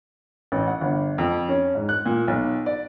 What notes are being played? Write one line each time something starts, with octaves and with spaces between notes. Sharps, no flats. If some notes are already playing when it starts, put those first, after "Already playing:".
A1
F#5
G1
F2
C#4
G#2
F#6
A#2
B1
D5